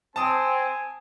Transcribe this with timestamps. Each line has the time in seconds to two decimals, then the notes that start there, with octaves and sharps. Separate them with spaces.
0.16 C4 G#5 A5 D#6